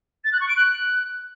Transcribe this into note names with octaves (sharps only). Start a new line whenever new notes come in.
A6
F#6
C#6
D7
F#6